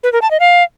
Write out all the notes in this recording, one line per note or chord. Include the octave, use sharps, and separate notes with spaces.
B4
A#4
A5
D#5
F5